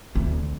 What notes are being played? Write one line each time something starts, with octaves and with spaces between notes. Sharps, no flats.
D2